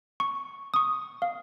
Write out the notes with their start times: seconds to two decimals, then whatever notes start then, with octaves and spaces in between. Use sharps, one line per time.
0.20 C#6
0.74 C#6 D#6
1.22 F5